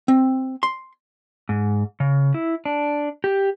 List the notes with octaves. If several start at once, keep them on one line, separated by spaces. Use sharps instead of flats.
C4
C6
G#2
C#3
E4
D4
G4